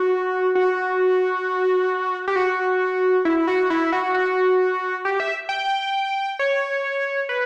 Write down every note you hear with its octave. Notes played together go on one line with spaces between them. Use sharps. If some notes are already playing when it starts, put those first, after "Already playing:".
Already playing: F#4
F#4
G4
F#4
E4
F#4
E4
F#4
F#4
G4
E5
G5
C#5
B4